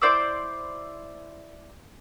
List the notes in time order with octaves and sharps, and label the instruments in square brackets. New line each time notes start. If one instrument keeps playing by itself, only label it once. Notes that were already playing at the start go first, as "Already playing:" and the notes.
[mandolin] E4 C5 D5 E6